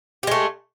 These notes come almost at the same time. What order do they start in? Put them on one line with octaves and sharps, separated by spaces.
G4 G#3 A3